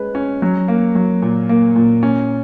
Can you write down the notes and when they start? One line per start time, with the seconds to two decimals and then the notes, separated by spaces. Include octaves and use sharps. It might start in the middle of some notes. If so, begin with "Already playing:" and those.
Already playing: G#3 C#4 B4
0.15 C#4
0.42 F#3
0.68 A#3
0.95 F#3
1.22 A#2
1.49 A#3
1.76 A#2
2.03 C#4